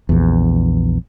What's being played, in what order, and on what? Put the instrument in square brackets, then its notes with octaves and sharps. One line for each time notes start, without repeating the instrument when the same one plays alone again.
[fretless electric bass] A#1 E2